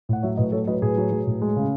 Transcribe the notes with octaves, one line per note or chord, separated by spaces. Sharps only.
A2 F#5
F#3 C#5 E5
A2 B4 D#5
F#3 A4 C#5
F#3 B4 D#5
A2 G#4 B4
F#3
F#3
A2
G#3
C#3